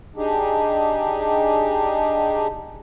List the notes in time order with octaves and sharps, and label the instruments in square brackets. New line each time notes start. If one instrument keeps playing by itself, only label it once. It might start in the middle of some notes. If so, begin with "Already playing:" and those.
[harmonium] D4 D#4 G4 G#4